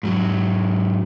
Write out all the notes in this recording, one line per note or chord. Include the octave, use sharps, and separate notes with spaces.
G#2 F#3